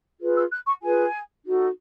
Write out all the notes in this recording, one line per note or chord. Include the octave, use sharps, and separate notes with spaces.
F4 G#4 B4
E6
F#6
C#6
F4 G#4 B4 G#5
D#4 F#4 A4